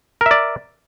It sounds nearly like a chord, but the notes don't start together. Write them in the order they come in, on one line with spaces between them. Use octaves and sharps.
A#4 E5 D5